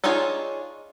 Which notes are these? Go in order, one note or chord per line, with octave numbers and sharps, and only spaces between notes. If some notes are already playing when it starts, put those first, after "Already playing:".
D4 D#4 F4 G#4 C#5